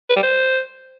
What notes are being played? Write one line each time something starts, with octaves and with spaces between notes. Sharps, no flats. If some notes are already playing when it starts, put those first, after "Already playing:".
B4
G3
C5